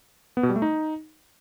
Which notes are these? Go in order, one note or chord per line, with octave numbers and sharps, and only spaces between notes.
B3
B2
G3
A3
D#4